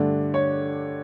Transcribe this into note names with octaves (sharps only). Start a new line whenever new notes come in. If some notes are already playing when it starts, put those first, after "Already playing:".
Already playing: G2 D3 A3 D4
C#5